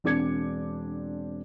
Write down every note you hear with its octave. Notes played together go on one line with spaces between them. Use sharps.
E1 C4 D4 D6 G#6 C#7